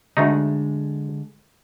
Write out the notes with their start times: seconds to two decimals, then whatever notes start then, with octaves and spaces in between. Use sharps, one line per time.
0.17 D2 D3 G#3 A3 D#4